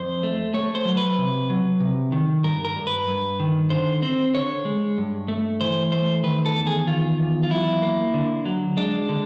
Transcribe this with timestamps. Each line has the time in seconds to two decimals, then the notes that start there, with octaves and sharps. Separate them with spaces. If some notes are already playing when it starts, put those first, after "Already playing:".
Already playing: F2 C5
0.23 A3
0.54 A3 C#5
0.75 C5
0.85 F#3
0.97 B4
1.18 C3
1.50 F#3
1.80 C3
2.12 D#3
2.44 G2 A#4
2.65 A#4
2.76 G2
2.87 B4
3.08 G2
3.40 D#3
3.70 D3 C5
4.02 C4 C5
4.34 D3 C#5
4.65 G#3
4.98 G2
5.28 A3
5.61 E3 C5
5.92 A3 C5
6.23 D#3 B4
6.46 A4
6.55 E2
6.67 G#4
6.87 D#3 F4
7.19 E2
7.43 F4
7.50 F#3 E4
7.82 A#3
8.14 D3
8.45 F#3
8.77 G#3 D4
9.09 D3